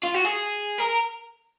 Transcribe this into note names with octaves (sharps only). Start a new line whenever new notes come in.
F4
F#4
G#4
A#4